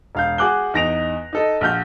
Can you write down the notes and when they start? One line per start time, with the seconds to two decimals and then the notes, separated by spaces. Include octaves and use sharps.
0.15 E1 F5 G6
0.38 F#4 G#4 D6 F#6 G7
0.74 E2 D#4 A#6 D7 F7
1.33 D#4 A4 D#5
1.61 A#1 F#4 F6 G6 G7